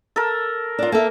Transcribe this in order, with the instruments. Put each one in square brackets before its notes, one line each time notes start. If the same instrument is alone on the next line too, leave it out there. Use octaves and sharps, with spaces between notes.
[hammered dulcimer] A4 A#4
[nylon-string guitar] D4 F4
A#3 A4 E5